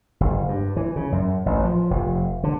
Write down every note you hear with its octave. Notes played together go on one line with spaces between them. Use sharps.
F#1
G2
E3
C#3
F#2
A1
F3
F1
D3